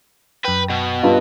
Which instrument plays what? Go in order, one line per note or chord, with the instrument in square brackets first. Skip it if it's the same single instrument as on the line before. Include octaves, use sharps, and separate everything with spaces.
[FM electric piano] F#2 G5 [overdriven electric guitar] B4
[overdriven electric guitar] B2
[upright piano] G2 F4